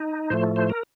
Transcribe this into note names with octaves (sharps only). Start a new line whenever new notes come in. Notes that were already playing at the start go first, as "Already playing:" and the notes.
Already playing: D#4
A2 F3 A3 C5
C5
A#4